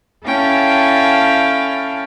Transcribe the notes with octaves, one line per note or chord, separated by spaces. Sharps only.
C#4 E4 A4 F5 G5 A5